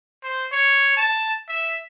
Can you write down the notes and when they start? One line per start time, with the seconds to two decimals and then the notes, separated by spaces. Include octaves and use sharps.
0.23 C5
0.52 C#5
0.97 A5
1.48 E5